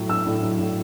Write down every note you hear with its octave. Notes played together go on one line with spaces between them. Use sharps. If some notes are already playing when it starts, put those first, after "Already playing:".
Already playing: A2 F#3
D4 E6
A2
F#3
A2